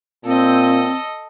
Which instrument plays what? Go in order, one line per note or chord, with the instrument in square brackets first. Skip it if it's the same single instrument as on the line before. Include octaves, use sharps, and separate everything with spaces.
[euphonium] A#2 [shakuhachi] C4 [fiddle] A4 D#5